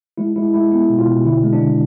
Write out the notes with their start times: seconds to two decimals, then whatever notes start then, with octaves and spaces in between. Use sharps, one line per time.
0.17 G#3 E4
0.36 G#3 E4
0.53 G#3 E4
0.72 B3 E4
0.90 B2
0.99 F4
1.08 B2
1.25 D3 E4
1.43 G#3
1.53 D4
1.62 D3